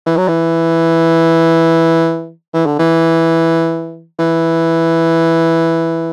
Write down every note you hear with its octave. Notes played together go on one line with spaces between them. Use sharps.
E3
F#3
E3
E3
D3
E3
E3